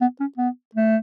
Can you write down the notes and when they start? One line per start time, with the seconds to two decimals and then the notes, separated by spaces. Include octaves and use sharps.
0.01 B3
0.20 C#4
0.37 B3
0.75 A3